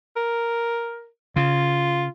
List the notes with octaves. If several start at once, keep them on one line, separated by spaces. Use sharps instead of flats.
A#4
C#3 F4